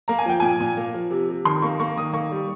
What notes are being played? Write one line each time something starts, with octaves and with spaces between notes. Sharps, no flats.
A#3 A#5
G#5
F3 G5
A#2 G#5
A#2
A#3
F3
C3
C3
D#3 C6
A#3 C#6
A#3 C#6
D#3 D#6
A#3 C#6
G3